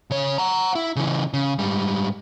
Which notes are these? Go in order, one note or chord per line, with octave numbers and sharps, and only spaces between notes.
C#3 C#5
F#5 A#5
E4
C#3 E3
C#3
G#2 G3